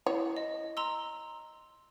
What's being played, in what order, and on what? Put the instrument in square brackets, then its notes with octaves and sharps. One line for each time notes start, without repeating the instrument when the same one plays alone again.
[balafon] E4 [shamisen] C#5
[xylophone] D#5
A#5 C6 E6